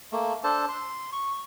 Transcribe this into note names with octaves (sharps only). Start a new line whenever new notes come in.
A3 A#3
D4 A4 C5 A5
C6
C#6